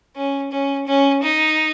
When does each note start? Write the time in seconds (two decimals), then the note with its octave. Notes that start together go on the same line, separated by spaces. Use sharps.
0.16 C#4
0.51 C#4
0.87 C#4
1.23 D#4